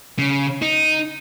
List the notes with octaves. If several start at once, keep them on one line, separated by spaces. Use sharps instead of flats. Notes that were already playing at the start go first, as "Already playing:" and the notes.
C#3
D#4